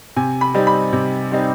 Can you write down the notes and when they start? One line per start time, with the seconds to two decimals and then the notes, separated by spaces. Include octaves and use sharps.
0.16 C3 G#5
0.41 B5
0.54 G3 C4 D#4
0.67 B5
0.93 C3
1.31 G3 C4 D#4